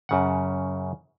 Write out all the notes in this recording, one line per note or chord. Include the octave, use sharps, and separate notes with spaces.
F#2 C#3 F#5